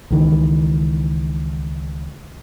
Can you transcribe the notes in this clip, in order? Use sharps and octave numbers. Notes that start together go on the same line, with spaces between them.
C#2 D#3 E3